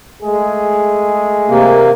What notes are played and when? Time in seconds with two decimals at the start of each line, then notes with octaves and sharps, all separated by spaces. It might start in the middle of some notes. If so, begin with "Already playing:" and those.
0.23 G#3 A3 G#4
1.49 C3 A#3